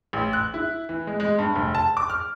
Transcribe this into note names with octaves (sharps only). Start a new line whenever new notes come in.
A1
F#6
E4
E3
G#3
G#3
G2
F1
A5
D6
F6